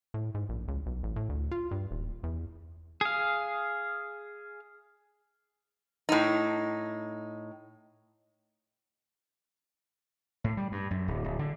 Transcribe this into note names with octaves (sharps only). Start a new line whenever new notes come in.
A2
G#2
A#1
C#2
B1
A1
A2
D2
F4
G2
D#1
E2
G#4 F5
A2 D#4
A2
G3
G2
F#2
D1
D1
D3